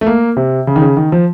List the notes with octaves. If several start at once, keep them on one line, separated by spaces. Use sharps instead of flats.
A3
A#3
C3
C#3
D#3
C#3
D#3
F3